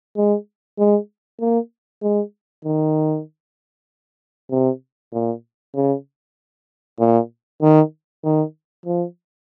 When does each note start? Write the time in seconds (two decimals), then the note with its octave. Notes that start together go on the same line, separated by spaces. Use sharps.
0.16 G#3
0.79 G#3
1.40 A#3
2.02 G#3
2.65 D#3
4.51 C3
5.13 A#2
5.75 C#3
7.00 A#2
7.62 D#3
8.24 D#3
8.86 F3